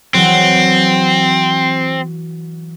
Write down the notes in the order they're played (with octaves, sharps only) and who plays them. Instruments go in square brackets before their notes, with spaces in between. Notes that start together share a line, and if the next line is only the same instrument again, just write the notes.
[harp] E3 F#3 [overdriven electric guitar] C4